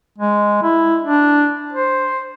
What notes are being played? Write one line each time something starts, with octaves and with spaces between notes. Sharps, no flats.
G#3
E4
D4
C5